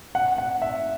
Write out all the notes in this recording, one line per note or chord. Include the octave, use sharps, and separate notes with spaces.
F#5
F#5
E5